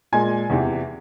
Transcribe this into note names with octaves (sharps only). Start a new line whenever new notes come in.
A#2 G#3 G#5 G#6
E2 C3 E3